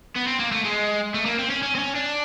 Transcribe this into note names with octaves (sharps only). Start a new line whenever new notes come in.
B3
C4
A#3
A3
G#3
A3
A#3
C4
C#4
C#4
C4
C#4
D4